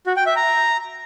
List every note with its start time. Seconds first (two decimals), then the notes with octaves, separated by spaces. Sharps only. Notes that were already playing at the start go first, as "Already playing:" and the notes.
0.07 F#4
0.16 G5
0.26 E5
0.36 A#5